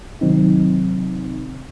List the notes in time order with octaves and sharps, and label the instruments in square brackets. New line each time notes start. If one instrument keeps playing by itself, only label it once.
[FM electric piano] C3 D#3 F#3 C4 D#4